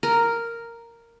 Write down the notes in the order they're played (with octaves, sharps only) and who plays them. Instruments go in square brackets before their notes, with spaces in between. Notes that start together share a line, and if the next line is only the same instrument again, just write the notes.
[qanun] A#4